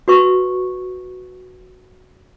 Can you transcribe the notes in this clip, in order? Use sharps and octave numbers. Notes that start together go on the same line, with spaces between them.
F#4 B4 C#6